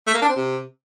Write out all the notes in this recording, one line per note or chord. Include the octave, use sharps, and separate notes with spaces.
A3
A#3
D4
C4
C3